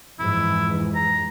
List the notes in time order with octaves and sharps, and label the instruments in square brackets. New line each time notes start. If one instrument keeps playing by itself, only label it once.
[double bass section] F2 G#2 E3 [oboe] E4
[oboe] A#5